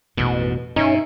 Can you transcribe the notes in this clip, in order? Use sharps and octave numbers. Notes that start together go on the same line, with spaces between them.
A1 F2 G#2 B2
G2 B2 C#4 D#4 E5